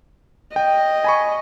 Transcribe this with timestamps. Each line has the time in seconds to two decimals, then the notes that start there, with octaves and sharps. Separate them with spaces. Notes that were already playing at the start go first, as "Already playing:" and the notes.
0.56 D#5 G5
1.04 G#5 B5 C#6